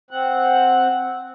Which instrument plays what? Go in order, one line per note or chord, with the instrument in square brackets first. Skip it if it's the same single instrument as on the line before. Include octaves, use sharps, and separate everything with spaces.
[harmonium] C4 F#5